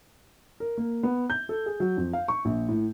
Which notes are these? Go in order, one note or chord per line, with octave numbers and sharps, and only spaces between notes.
A#4
A#3
B3
G6
A4
G#4
F#3
F2
F5
C#6
A#1
A2